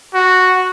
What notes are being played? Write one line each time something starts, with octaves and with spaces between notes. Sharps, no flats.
F#4